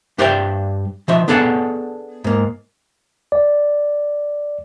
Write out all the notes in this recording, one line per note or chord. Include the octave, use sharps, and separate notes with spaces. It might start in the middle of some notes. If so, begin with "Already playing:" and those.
G2 G4 C5 D5 E5 G5
D#3 F3 E5
B3 D4 G#4 A4 D5 F#5
G#2 A#3
D5